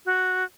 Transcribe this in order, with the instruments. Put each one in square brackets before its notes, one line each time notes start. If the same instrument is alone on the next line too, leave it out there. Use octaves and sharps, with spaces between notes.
[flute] F#4